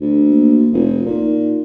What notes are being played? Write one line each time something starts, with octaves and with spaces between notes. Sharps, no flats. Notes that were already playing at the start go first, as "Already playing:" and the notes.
D2
A#3
F1 F4
A#2 D#4